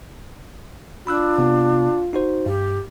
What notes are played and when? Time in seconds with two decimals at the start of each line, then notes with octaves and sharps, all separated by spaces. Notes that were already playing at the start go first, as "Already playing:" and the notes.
1.07 D4 F4 B5 E6 F#6
1.38 C3 B3
2.13 D#4 F#4 C5
2.46 G2 G4